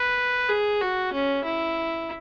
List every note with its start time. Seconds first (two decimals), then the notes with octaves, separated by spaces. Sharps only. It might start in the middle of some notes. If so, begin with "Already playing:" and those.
Already playing: B4
0.49 G#4
0.81 F#4
1.13 C#4
1.44 E4